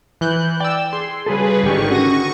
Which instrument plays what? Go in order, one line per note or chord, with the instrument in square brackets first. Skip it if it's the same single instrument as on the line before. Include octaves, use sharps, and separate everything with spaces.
[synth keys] E3 F#6 G6
[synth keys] D5 E6 [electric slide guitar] G5
[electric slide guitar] G#4 [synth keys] C6
[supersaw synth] C#3 G#4 B4 [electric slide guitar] G3 F#4 A4
[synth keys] G#1 G4 [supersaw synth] D3 D#3 C#6
[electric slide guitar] C#4 [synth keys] F#4 A#6 D#7 [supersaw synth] C#6